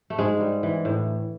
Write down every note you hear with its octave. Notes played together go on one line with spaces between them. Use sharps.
A3
G#2 G#3
G3
E3
A2